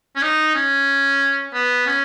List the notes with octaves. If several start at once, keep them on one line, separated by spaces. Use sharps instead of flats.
C#4
D#4
C#4
B3
C#4